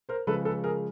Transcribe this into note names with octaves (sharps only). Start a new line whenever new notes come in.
A#4 C5
C#3 F3 G#3 A4 B4
A4 B4
G#4 A#4